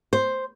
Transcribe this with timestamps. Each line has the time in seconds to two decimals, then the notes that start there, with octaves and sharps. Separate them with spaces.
0.13 C5